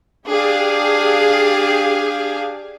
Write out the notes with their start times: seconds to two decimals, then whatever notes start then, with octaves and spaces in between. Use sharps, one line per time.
0.28 D4 G4 G#4 F5